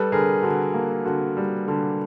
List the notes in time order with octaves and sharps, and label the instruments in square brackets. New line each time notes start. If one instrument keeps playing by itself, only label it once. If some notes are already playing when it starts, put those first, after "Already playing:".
Already playing: [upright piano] G3 A4 B4
D3 G#4 A#4
D3 F#4
A#3
D3 F#4
G3
D3